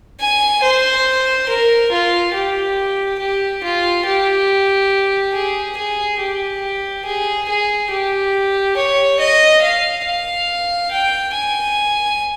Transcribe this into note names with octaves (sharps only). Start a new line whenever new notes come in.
G#5
C5
A#4
F4
G4
G4
F4
G4
G#4
G#4
G4
G#4
G#4
G4
C#5
D#5
F5
F5
G5
G#5